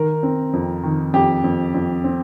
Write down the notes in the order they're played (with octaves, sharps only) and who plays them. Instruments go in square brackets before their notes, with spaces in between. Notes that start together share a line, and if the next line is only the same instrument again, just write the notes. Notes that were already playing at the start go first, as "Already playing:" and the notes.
Already playing: [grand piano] D#3 A#4
C4
F2
D#3
F2 G4
F2
F2
C4